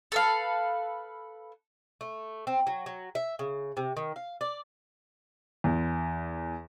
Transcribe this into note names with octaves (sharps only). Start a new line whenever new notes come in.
A4 B4 F5
A3
C4
F#3
F#3
E5
C#3
C3
D#3
F5
D5
E2